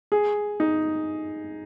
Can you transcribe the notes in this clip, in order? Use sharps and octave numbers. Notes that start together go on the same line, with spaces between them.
G#4
D#4